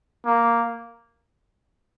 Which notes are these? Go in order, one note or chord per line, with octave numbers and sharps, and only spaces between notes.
A#3